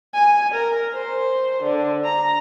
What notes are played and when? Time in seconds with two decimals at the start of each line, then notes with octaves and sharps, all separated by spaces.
0.14 G#5
0.54 A#4
0.93 C5
1.63 D3
2.04 A#5